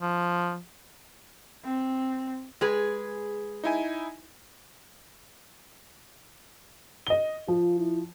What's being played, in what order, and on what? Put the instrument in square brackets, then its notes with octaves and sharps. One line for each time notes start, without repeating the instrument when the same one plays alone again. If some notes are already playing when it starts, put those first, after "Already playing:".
[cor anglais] F3
[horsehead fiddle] C4
[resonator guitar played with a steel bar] G#3 G#4 B4
[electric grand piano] D#4 E4 G#5
[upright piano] D#5 G7
[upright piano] F3 [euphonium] F4
[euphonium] E4